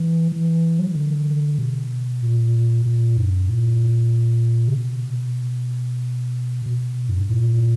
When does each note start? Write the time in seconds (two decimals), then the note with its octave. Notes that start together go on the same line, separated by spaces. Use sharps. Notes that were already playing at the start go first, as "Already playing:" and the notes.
Already playing: E3
0.32 E3
0.79 F#3
0.88 E3
0.95 D3
1.58 B2
2.22 A#2
2.86 A#2
3.17 F#2
3.50 A#2
4.68 C#3
4.76 B2
6.66 B2
7.09 F#2
7.20 G2
7.30 A#2